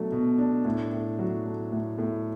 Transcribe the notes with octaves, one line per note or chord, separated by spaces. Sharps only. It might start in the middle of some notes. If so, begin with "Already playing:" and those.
Already playing: B2 F#3 A3 D4
B2
D4
A2
A2
F#3
A3
A2
A2